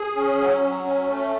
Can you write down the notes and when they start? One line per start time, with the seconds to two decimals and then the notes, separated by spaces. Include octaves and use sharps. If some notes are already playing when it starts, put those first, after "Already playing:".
Already playing: G#4
0.16 C#4
0.39 F#3
0.62 F#3
0.85 C#4
1.07 A3